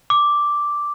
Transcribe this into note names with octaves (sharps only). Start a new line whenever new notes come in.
D6